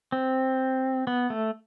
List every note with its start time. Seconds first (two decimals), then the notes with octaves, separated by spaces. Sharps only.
0.12 C4
1.07 B3
1.30 A3